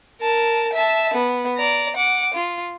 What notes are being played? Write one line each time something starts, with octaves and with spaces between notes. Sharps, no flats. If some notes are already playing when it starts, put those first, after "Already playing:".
A#4 A5
E5 A5
B3
D5 A#5
F#5 D6
F4